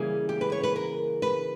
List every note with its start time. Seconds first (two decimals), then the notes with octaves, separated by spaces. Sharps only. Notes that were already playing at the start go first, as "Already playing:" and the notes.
Already playing: C#3 E3 G3 A#3 G#4
0.29 G4
0.41 B4
0.52 C#5
0.63 B4
0.76 A#4
1.22 B4